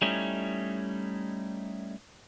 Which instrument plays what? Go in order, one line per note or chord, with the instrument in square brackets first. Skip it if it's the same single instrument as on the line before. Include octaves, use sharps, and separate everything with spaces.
[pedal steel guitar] G3 A3 C#4 D#4 E4